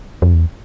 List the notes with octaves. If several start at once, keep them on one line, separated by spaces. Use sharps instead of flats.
F2
E2